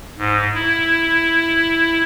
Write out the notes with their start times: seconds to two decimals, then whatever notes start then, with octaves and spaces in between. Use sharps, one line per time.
0.18 G#2
0.55 E4